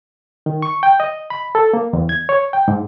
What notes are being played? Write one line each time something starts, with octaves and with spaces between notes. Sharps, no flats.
D#3
C#6
G5
D#5
B5
A4
A#3
E2
G#6
C#5
G5
G#2